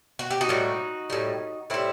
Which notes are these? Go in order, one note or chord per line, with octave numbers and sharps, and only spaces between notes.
F#4
G4
D#4 F#4
A2 G3
A2 G3
A2 G3 C4 E4